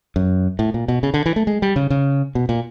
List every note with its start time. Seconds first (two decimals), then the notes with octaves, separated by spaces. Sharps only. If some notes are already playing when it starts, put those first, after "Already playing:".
0.16 F#2
0.59 A2
0.74 A#2
0.88 B2
1.03 C#3
1.14 D3
1.26 E3
1.36 A3
1.47 G#3
1.62 G3
1.76 C#3
1.90 C#3
2.35 B2
2.49 A#2